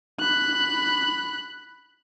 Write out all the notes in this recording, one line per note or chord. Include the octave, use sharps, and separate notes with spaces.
B5 F#6